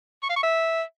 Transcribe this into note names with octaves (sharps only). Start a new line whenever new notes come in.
C#6
F5
C#6
E5